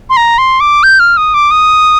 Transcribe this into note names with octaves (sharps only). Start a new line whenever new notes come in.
C6
A#5
C6
D6
G6
F6
D#6
D6
D#6